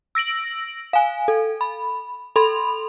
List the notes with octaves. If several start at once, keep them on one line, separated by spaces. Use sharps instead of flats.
E6 A#6 D7 F#7
F5 G#5
A4
B5
A4 B5 C6 F7